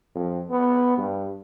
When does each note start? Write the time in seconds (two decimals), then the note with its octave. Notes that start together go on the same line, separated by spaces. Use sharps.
0.15 F2
0.51 B3
0.98 G2